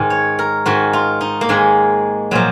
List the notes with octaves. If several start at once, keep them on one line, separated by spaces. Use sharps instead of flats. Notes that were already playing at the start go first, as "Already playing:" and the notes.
Already playing: G#2 D#3
C#5
A#4
G#2 D#3 F#4
F4
D#4
A#3
G#2 D#3 G#3
A#2 F3 F#3